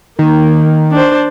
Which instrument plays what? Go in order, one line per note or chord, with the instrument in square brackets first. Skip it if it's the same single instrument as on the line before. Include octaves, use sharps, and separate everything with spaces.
[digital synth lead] D#3 [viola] A#3
[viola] D4 C5